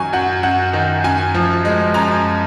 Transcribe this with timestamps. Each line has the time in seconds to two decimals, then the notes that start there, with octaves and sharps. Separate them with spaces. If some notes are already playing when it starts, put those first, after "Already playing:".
Already playing: F#2 D#3 F#3 G#5 C#6
0.13 F#2 F#5
0.43 F#2 F#5
0.73 D#3
1.04 F#2 G#5
1.35 F3
1.65 G#3
1.94 F#2 A#5